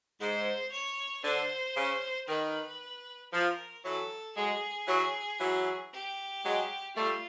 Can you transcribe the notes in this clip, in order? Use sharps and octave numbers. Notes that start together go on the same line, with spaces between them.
G#2 C5
C#5
D3 C5
C#3
D#3 B4
F3 A#4
E3 F#3 A4
F#3 G#3 G#4
E3 F#3
E3 F#3
G4
F#3 G#3
G3 A3 F4